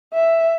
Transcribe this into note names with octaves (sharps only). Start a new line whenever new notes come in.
E5